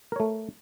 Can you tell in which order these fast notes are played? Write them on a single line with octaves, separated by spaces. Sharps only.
A#4 C#5 A3